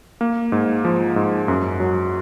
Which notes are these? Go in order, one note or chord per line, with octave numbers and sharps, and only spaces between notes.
A#3
G#2
F3
G#2
F#2
F#3